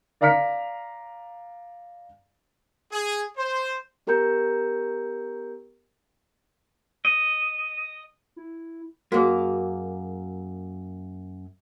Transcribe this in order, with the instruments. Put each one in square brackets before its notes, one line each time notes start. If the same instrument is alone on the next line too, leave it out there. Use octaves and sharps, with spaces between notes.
[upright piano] D5 F5 A#5 F6 B6 C#7
[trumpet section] G#4
C5
[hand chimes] B3 G4 A#4 A#5 G6 C#7
[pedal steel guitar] D#5
[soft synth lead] E4
[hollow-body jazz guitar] F#2 A#3 [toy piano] F#4 G#4